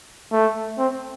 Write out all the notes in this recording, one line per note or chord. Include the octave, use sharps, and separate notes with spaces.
A3
C4